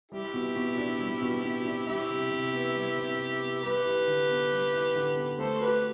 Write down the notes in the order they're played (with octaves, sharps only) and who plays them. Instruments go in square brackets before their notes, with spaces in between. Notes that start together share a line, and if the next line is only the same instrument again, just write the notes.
[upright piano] G3 [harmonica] E4 G4
[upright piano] B2
B2
D4
G3
B2
B2
D4
[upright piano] G3 [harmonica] E4 G4
[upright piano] C3
C3
B3
G3
C3
C3
B3
[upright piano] G3 [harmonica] G4 B4
[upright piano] E4
D3
B3
G3
E4
D3
B3
[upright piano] A3 [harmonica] A4 C5
[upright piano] F#4 [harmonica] G4 B4